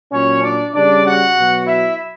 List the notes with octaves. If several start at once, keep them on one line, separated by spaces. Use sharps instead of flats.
A#2 F#3 C#4 C#5
D4 D5
C#3 G3 D4 D5
F#4 F#5
B2 F#3
E4 E5